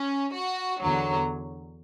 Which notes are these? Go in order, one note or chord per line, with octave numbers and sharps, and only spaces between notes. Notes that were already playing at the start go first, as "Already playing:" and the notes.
Already playing: C#4
F#4
E2 D3 F#3